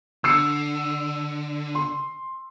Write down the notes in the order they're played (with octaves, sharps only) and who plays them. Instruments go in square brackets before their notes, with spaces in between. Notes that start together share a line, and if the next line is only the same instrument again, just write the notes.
[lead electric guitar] D3 [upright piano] E6 C7 C#7
[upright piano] C6